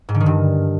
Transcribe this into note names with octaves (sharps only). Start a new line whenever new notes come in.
G#2
D3
D#3
G2